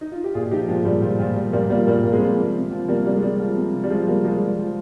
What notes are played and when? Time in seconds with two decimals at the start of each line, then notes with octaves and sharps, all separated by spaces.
0.01 D#4
0.12 F4
0.24 G4
0.34 A#2 F4 G#4
0.51 F3 D#4 G4
0.68 A#2 F3 G#3
0.85 A#2 G3
1.02 A#2 F3
1.19 A#2 F3
1.36 F3 G3
1.53 A#2 G3 A#3
1.70 F3 G3 A#3
1.87 A#2 G3 A#3
2.04 A#2 A#3
2.13 G#3 C4
2.21 F3
2.38 C3
2.55 C3
2.71 F3
2.88 C3 G3 A#3
3.06 C3 G3
3.15 G#3
3.22 C3 G3
3.40 F3
3.57 C3
3.73 C3
3.84 G3
3.90 F3 G#3
4.08 C3 G3 A#3
4.24 F3 G#3
4.41 F3
4.59 F3